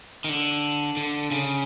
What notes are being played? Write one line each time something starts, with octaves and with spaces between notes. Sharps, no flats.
D#3
D3
D3
C#3